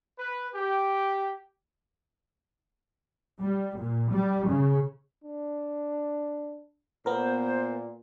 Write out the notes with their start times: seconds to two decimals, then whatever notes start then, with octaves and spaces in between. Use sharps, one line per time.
0.19 B4
0.54 G4
3.41 G3
3.78 A#2
4.11 G3
4.49 C#3
5.24 D4
7.06 A#2 B3 A#4 C5